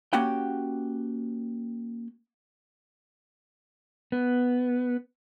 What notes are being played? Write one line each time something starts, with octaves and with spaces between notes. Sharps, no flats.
A#3 C#4 F#4 G4 F#5 G5
B3